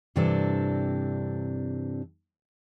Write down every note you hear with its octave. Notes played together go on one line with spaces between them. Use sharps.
G2 C3 E3 C4 D4 A4